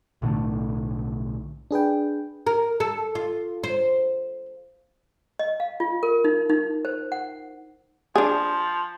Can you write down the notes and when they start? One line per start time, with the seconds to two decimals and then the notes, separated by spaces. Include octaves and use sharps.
0.22 B1 A2 D3 A3
1.71 D4 G#4 B4 G5
2.47 A#4
2.80 A4
3.15 F4
3.64 C5
5.39 D#5
5.60 F5
5.80 F4
6.03 A#4
6.24 D#4
6.50 D#4
6.85 C5
7.12 F#5
8.16 F3 D4 G#4